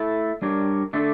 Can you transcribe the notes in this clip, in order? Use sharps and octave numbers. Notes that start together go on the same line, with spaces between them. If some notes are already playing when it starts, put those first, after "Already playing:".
Already playing: A3 E4 A4
G3 D4 G4 A#4 C#5
D3 A3 D4 A4